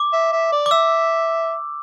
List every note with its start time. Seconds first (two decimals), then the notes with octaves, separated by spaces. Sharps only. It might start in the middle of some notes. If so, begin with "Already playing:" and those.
Already playing: D6
0.13 E5
0.32 E5
0.52 D5
0.66 D6
0.71 E5 E6